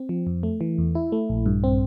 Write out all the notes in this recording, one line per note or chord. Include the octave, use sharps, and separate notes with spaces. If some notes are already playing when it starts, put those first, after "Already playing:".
Already playing: C4
F3
F2
A3
E3
E2
E4
A3
A#1
G2
C4